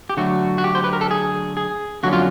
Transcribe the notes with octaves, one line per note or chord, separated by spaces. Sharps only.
G4
D3 F#3 A3 F#4
F#4
G4
C5
B4
A#4
A4
G#4
G#4
F2 D3 F#3 A#3 C#4 F#4
F4